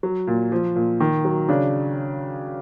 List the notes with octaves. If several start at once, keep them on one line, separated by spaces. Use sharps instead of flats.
F#3
A#2
F3
A#2
D#3
F#3
C#3 D4